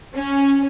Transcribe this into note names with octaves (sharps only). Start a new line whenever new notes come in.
C#4